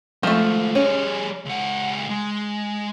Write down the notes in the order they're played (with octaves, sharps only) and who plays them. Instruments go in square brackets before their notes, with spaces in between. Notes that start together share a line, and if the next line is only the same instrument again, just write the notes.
[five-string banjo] F3 A3 [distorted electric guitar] G#3 C4
[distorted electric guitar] G3 G#4 [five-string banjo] C#4
[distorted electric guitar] C#2 F#5
G#3